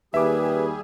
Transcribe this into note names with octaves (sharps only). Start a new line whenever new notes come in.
D#2 G3 G#4 B4 E5 D6